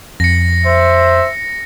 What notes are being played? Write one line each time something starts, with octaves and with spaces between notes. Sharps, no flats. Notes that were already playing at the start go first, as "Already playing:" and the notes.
F2 A#6 C#7
C5 E5